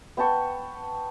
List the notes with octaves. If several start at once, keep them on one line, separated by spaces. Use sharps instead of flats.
B3 G5 A5 C#6